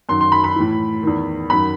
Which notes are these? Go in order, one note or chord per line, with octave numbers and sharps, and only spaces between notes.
F#2 D#3 C6
C6
B5
B5
A2 E3
E2 D#3
F#2 D#3 B5